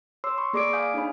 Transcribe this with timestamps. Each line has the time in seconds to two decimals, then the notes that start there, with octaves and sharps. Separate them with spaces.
0.24 C#5 C6 D6 E6 C7
0.38 B5 C#6 E6
0.53 A#3 G#4 D5 D6 C7 D7
0.73 F5 G#5 D#6 G6
0.94 D4 D#4 G#4 C#5 B5